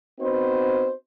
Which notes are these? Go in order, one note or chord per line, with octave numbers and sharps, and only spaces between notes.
B3 C4 D#4 F#4 B4 C5